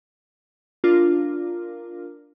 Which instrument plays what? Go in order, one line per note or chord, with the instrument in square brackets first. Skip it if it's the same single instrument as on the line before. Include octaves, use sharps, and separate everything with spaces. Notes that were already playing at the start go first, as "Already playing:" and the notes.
[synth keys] D4 F4 A#4